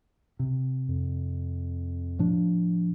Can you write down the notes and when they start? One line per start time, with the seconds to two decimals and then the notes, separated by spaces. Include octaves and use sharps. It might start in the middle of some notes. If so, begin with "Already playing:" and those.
0.39 C3
0.88 F2
2.19 A2 F3 D4